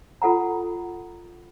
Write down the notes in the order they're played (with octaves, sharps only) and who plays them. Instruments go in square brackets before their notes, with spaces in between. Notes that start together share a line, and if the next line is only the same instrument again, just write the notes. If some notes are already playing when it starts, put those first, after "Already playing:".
[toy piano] F4 A4 F#5 A#5